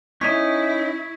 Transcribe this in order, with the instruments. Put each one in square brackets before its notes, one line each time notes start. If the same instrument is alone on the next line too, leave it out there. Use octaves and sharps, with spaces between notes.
[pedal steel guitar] C#4 D#4 [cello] E4 [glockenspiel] C#6 G#6 B6